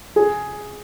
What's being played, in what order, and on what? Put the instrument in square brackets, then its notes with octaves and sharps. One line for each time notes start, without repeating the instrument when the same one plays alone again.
[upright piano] G#4